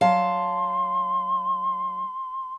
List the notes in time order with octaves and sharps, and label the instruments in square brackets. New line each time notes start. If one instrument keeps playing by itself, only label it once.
[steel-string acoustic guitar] F#3 F5 A5 [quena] C6